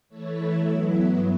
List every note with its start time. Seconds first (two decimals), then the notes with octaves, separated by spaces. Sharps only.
0.09 E3 A3 E4 A4 C#5
0.56 F#3 B3 E4
1.05 G2 F#3 B3